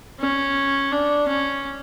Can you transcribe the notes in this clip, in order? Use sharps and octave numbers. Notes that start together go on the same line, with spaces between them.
C#4
D4
C#4